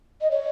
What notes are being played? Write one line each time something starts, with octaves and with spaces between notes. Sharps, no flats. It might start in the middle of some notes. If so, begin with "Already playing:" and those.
D#5
C#5